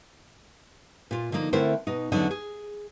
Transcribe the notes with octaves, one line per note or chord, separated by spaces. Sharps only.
A#2 F4
D3 F3 A#3 D#4
D3 A3 C4 E4 A#4 C5
B2 D#4
E2 D3 F#3 C#4 D#4 D5
G#4